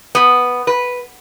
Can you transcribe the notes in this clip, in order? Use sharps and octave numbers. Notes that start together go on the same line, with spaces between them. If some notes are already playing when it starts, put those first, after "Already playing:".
B3
B4